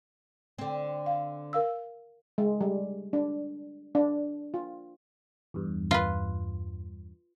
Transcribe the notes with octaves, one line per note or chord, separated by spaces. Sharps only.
D3 C4
F5
A#4 F5 E6
G#3
G3
D4
D4
F4
E2 G2
F4 B4